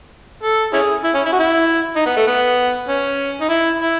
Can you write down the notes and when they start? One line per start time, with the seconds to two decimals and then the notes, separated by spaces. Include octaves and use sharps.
0.43 A4
0.73 C#4 E4 G#4
1.04 E4
1.14 C#4
1.25 E4
1.32 F#4
1.39 E4
1.96 D#4
2.06 B3
2.17 A3
2.27 B3
2.88 C#4
3.41 D#4
3.49 E4
3.80 E4